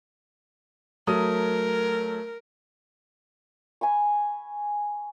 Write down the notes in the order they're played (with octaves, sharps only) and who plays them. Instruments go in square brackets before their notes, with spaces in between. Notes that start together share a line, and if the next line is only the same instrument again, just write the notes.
[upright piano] F#3 A3 D#6 [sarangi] A#4
[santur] G#5 B5 C#6